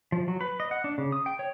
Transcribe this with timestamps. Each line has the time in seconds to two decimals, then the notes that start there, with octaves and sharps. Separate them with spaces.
0.12 F3
0.28 F#3
0.41 B4
0.60 D#5
0.71 F#5
0.84 D4
0.98 C#3
1.12 D#6
1.26 G5
1.39 C#5